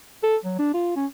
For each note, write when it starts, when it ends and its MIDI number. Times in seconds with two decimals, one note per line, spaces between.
0.23 0.37 69
0.45 0.56 54
0.59 0.71 62
0.74 0.91 65
0.96 1.06 61